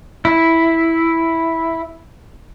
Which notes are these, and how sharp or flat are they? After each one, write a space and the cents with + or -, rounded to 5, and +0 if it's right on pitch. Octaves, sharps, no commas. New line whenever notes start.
E4 -5